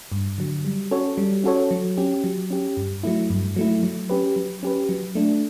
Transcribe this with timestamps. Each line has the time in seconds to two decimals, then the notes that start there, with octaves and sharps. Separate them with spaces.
0.12 G2
0.38 D3 F#3
0.65 G3
0.91 C#4 F#4 A4 C#5
1.18 G3
1.44 C#4 F#4 A4 C#5
1.71 F#3
1.97 C#4 G4
2.24 F#3
2.50 C#4 G4
2.77 G2
3.03 F#3 A3 E4
3.30 G2
3.57 F#3 A3 E4
3.83 F#3
4.10 C#4 G4 B4
4.36 F#3
4.63 C#4 G4 B4
4.89 F#3
5.15 A3 D4